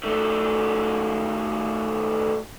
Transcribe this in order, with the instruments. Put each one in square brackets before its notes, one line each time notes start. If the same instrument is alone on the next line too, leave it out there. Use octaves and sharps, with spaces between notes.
[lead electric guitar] D#3 A3